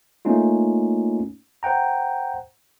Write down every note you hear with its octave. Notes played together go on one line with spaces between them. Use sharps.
A3 A#3 C#4 D#4 F4
C5 F#5 G5 A#5